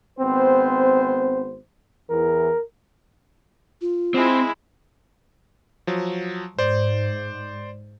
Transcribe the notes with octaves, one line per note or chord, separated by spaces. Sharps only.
G#1 B3 C4 C5
E2 E3 A#4
F4
G#3 C4 E4
F3 F#3
G#2 C5 D5